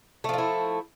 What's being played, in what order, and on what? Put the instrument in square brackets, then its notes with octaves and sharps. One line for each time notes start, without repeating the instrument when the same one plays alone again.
[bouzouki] A3
F3
F4
E4